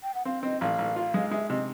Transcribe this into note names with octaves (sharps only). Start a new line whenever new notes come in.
G5
F#5
C4 F5
C4 D#5
A1 F5
A1
F4
G#3
G#3 E5
C3 D#5